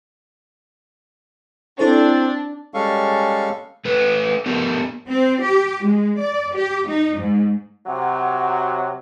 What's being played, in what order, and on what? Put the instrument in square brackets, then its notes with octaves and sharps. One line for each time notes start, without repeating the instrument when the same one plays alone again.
[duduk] C4 [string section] D4 [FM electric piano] E4 A4 C5
[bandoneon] G3 G#3 C#4 A4 F5 C#6
[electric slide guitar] A3 B4
A3 B3 G4 A#4
[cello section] C4
G4
G#3
D5
G4
D#4
G#2
[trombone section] C3 F#3 [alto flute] F#5